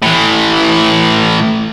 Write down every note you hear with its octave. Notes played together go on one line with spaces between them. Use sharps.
A2 E3